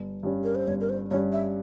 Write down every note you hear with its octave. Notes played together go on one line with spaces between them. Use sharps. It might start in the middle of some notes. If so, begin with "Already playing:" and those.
Already playing: G1
G2 G3 C#4
A#4
C5
G1 C#5
A#4
C5
G2 G3 C#4 C#5
E5